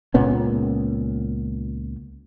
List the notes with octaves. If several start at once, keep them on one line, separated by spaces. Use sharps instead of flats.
C#2 A#2 B3 C#4